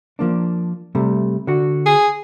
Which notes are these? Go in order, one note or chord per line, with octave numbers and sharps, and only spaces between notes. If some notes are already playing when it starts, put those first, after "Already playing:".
F3 A#3 D4
C3 G3 A3
D3 F#4
G#4